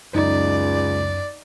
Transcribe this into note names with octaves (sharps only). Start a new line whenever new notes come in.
C#2 F#2 D#4 D5